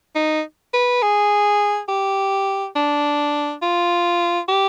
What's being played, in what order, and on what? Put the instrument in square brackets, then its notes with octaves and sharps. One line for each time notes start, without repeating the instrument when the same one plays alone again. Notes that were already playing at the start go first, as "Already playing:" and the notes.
[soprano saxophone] D#4
B4
G#4
G4
D4
F4
G4